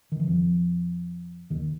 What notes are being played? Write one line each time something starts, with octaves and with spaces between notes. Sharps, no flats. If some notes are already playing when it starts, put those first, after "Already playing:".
D#3
E3
F2 F3
D#2 D#3